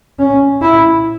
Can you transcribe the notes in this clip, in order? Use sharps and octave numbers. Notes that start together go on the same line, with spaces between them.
C#4
E4